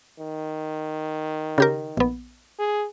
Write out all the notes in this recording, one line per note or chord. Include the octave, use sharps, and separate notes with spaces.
D#3
C#3 G4 A#4
A#1 B3
G#4